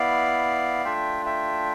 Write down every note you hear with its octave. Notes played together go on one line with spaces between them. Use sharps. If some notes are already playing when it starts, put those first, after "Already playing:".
Already playing: B3 E4 D5 F5
A3 D4 F4 E5 G5
E5 G5